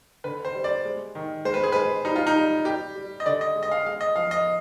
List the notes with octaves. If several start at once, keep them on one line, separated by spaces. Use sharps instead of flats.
D3 B4
C5
G3
D5
G#3
D#3
G#3 C5
B4
G#4
G#3 B4
G3 D#4
F4
D#4
G3
G3 G4
G3
D#5
D3 D5
D#5
G#3
D#5
F5
G#3 F5
D#5
F3 F5
D#5